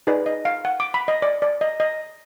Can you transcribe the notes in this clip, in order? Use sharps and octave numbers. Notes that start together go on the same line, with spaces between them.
D#4 G#4 B4 D5
D#5
F5
F#5
D6
B5
D#5
D5
D5
D#5
D#5